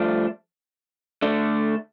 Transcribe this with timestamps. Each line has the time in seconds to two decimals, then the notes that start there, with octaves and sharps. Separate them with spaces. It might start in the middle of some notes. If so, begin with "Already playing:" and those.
Already playing: G2 F3 A3 D4
1.22 D3 A3 D4